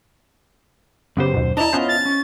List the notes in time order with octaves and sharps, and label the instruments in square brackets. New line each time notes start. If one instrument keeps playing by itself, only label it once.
[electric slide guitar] F#2 C5 [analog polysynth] C#3 B3 G4
[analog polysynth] D#2 B2
[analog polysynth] D4 E4 [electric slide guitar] D#5 A#5 [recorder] A5
[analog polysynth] B3 C#4 C5 [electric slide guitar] E4 F4 D#5
[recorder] A6
[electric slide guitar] C#4